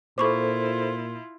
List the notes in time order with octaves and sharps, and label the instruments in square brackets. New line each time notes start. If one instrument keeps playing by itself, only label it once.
[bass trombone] A#2 [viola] E4 F4 [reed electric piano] A4 C5 [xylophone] B5 C#6 D6